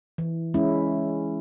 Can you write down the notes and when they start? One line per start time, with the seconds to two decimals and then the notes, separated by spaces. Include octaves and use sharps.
0.18 E3
0.54 G#3 C#4 E4